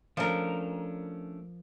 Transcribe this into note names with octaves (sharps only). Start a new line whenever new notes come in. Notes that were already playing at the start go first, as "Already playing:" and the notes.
F3 A3 C#4 D4 A#4